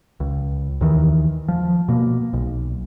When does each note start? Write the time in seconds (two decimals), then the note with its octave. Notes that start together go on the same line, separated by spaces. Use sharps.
0.20 C#2
0.81 D#2 D#3 E3
1.48 F3
1.88 B2 A#3
2.33 B1